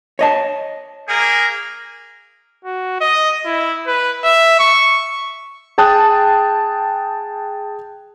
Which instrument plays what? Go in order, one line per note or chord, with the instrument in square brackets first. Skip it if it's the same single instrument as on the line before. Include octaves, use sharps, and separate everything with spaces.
[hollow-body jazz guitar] C#5 D#5 A5
[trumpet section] A#3 G#4 A#4
[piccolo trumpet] F#4
D#5
E4
B4
E5
C#6
[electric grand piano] G#4 G5 A5 D#6 F#6